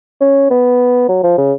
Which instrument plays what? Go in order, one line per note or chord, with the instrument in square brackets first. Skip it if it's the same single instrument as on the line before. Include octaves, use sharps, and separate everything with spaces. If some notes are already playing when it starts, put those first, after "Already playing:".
[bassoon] C#4
B3
F#3
F3
C#3